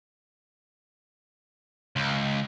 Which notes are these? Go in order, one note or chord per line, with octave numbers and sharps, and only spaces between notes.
C#2